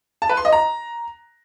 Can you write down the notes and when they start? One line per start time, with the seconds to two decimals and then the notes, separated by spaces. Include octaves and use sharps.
0.22 A5
0.30 B4
0.37 C6
0.45 D#5
0.52 A#5